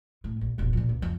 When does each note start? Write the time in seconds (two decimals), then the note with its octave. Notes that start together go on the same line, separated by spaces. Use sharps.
0.24 A2
0.41 A#1
0.58 E1 A#1
0.73 A#2 F3
0.89 C#2
1.02 F2